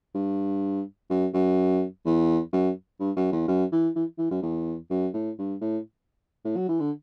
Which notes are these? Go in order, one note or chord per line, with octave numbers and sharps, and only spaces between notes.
G2
F#2
F#2
E2
F#2
G2
F#2
E2
F#2
E3
E3
E3
F#2
E2
F#2
A2
G2
A2
A2
F#3
E3
D3